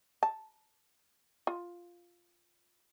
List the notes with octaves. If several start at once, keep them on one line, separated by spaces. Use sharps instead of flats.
A5
F4